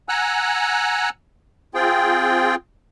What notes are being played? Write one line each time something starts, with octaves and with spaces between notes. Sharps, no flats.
F#5 G#5 A#5 E6 F#6
C4 F4 G#4 G5